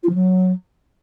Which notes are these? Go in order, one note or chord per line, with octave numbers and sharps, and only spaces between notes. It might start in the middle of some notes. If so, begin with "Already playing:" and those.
F4
F3
F#3